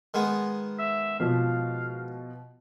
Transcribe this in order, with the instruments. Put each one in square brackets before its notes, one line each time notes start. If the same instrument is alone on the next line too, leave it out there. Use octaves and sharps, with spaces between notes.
[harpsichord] D#3 G#3 B3
[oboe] E5
[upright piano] B2 F3 [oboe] F5